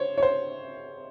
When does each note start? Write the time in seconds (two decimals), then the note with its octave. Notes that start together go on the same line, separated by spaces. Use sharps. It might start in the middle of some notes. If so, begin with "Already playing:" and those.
Already playing: C5 C#5
0.18 C#5
0.23 C5